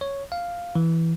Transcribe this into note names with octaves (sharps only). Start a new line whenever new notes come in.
C#5
F5
E3